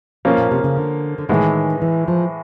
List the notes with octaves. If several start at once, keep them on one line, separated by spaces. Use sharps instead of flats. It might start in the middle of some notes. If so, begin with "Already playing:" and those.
B2 F3 A#3 C#4
A#2
C3
C#3
D3
D3
A2 D#3 E3 G#3
E3
F3